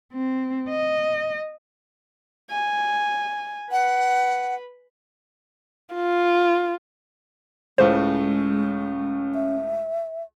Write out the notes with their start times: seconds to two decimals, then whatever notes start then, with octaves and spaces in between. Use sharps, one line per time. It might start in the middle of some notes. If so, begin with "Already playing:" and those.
0.13 C4
0.69 D#5
2.51 G#5
3.72 B4 F#5
5.95 F4
7.78 C#2 A2 C#3 G#3 C#4 C5
9.34 E5